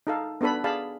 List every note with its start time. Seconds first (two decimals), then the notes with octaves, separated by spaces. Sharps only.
0.07 D#4 A4 F5
0.41 B3 D4 A4 B4 B5
0.64 G#4 D5 F5 A5 B5